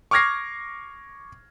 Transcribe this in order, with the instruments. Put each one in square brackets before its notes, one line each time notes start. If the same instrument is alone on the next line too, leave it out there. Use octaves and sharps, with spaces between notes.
[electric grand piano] C#6 D6 F6 G#6 A#6 C7